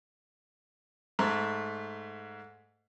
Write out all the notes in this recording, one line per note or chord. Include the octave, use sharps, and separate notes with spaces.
G#2 A3